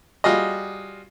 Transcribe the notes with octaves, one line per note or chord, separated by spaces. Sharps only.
G3 F4 F#4 G#4 D#5